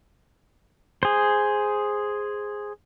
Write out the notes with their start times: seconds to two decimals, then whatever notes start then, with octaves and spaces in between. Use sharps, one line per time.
1.03 G#4 C5